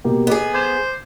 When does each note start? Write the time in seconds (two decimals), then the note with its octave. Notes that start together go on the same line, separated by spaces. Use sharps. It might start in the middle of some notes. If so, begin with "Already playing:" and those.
0.04 B2 A#3 G4
0.27 B3 G#4 D#5 D6
0.54 C5 D6 G#6 E7